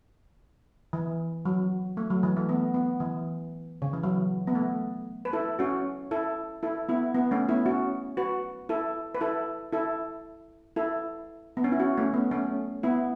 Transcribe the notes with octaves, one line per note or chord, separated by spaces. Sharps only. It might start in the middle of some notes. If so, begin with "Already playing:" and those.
E3
F#3
A3
F#3
E3
A3
B3
B3
E3
C#3
E3
F#3
B3
A3
B4
E4 A4
C#4 F#4
E4 A4
E4 A4
B3 E4
B3
A3 C#4
B3 E4
C#4 F#4
F#4 B4
E4 A4
B4
E4 A4
E4 A4
E4 A4
B3
C#4
E4
C#4 F#4
A3 C#4
B3
A3 C#4
B3 E4